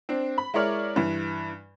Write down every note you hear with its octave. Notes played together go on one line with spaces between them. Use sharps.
C4 D4
B5
G#3 E4 A#4 C#5 D5 F6
G2 E3